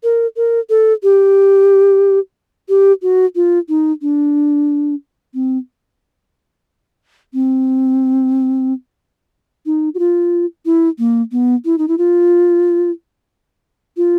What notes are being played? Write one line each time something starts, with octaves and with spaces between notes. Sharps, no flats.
A#4
A#4
A4
G4
G4
F#4
F4
D#4
D4
C4
C4
D#4
F#4
F4
E4
A#3
B3
E4
D#4
E4
F4
F4